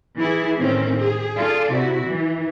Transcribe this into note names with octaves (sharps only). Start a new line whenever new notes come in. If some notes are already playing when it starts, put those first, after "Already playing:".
E3 E4 G#4
A2 D#3 C4 C#4
G#4
F4 G#4 A4 D5
C3 E4 F#4
E3